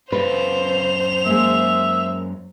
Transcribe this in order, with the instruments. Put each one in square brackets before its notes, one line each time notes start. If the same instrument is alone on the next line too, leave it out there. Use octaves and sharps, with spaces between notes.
[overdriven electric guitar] F#2 F4 [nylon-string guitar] B4 [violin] C5 F7
[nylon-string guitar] G#3 A#3 [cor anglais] E5